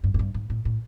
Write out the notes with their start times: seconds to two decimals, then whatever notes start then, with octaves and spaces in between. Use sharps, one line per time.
0.04 G2
0.14 G#2
0.19 G2
0.34 G#2
0.50 A2
0.65 A2